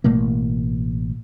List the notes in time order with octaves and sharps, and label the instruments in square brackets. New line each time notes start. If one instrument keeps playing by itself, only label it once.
[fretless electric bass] A1 B2 A3 A#3